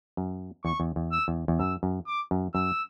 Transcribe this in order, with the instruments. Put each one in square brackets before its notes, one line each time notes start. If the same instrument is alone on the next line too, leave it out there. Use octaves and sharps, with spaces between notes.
[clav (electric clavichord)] F#2
[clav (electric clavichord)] E2 [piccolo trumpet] C#6
[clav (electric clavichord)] E2
E2
[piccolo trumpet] E6
[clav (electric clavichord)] E2
E2
[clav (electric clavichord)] F#2 [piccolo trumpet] E6
[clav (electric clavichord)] F#2
[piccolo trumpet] D6
[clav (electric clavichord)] F#2
[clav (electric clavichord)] F#2 [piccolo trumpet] E6